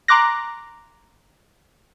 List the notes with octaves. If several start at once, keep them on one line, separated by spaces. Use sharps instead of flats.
A#5 C6 D6 F#6 A#6